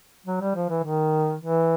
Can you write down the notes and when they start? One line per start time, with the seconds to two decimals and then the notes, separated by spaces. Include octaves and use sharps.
0.26 F#3
0.41 G3
0.55 F3
0.69 E3
0.83 D#3
1.40 E3